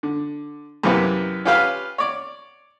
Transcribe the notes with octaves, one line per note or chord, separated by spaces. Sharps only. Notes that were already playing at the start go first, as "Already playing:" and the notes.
D3
F#2 C3 E3 A#3 B3
C#4 F4 G4 B4 F5 B5
C#5 D5